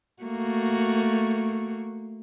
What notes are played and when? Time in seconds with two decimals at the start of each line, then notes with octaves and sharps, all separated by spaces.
0.23 A3 A#3 F#4